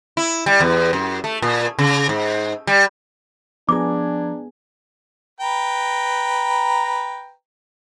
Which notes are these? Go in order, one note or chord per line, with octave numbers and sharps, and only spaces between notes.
E4
G3
E2
F#2
A3
A#2
C#3
G#2
G3
F3 B3 D4 G#4 A#5 D6 G#6
B4 G5 A#5